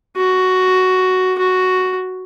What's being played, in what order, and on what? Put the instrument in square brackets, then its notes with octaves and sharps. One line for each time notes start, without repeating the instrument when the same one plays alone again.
[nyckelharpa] F#4
F#4